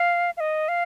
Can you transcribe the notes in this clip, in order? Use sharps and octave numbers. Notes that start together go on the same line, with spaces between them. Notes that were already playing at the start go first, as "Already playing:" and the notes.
Already playing: F5
F5
D#5
F5